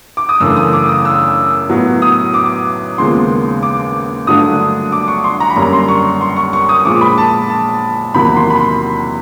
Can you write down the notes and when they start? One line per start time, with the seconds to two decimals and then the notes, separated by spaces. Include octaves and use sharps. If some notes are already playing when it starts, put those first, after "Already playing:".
0.17 D6
0.29 D#6
0.40 F#2 C#3 E3 A3 D4 E6
0.57 D#6
0.73 D6
0.89 D#6
1.05 E6
1.69 A2 F#3 B3
2.02 D#6
2.34 D6
2.98 D#2 C#3 F3 G#3 B3 C6
3.63 D6
4.27 G2 D3 F#3 A3 D4 D#6
4.92 D6
5.08 C#6
5.24 C6
5.40 A#5
5.50 B5
5.56 F#2 D3 G3 A#3 C#4 A#5
5.73 C6
5.88 C#6
6.21 C6
6.36 C#6
6.53 C#6
6.69 D#6
6.85 A#2 F3 G#3 D6
7.01 B5
7.18 A5
7.50 A5
8.14 E2 C3 D#3 F#3 A#3 B5
8.36 C6
8.50 B5
8.57 C6